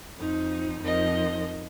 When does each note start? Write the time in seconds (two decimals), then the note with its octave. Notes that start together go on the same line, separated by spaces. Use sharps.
0.18 F2 F3 D#4
0.80 F2 F3 D#4 A#4 D#5